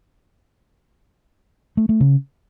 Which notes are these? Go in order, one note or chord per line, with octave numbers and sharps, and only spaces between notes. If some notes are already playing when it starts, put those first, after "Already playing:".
A3
A3
C#3